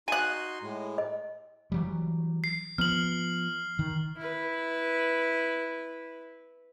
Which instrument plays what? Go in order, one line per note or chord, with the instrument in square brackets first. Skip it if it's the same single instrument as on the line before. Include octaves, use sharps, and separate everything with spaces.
[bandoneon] D#4 F#4 C6 [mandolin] G#5 F#6
[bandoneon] A2 G#3
[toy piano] D#5
[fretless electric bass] E3 F#3 G3
[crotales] C7
[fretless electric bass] F3 B3 [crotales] F6 F#7
[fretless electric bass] D#3
[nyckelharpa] E4 B4